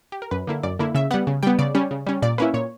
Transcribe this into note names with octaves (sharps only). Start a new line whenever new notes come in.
G4
A#4
F#2 B4
D3 A#3 E4
F#2 D5
D3 A#3 E4
C#3 E5
G3 B3 F#5
C#3
G3 B3 G5
C#3 D5
G3 C#4
C#3
G3 C#4
A#2 D5
A#3 C#4 E4 B4
A#2 C#5